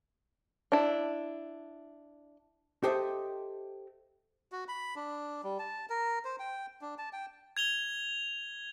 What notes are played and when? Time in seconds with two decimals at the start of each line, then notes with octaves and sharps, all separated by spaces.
0.72 D4 E4
2.83 G4 A4 C5 D#5 E5 G5
4.52 F#4
4.68 B5
4.96 D4
5.43 G3
5.59 A5
5.90 A#4
6.25 C5
6.39 G5
6.81 D4
6.98 A5
7.13 G5
7.57 G#6 F7 G7